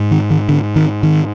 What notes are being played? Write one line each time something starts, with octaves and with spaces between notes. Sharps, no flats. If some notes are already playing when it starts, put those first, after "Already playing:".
Already playing: G#2
D#3
D#3
D3
D#3
D#3